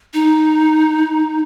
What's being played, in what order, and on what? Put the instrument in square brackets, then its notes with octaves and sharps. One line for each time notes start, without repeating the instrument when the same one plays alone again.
[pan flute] D#4